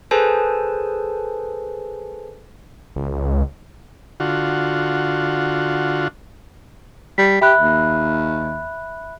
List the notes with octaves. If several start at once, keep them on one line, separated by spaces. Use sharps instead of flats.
G#4 A4 B4 C5 G#5 A5
C#2
D3 F4 F#4
G3 B6
G4 E5 B5 F#6
D#2